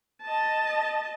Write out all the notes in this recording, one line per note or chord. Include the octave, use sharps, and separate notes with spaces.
D#5 A5